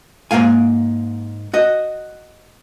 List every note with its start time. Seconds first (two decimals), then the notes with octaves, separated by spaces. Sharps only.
0.31 G#2 A3 A#3 F5 G#5
1.54 F#4 D#5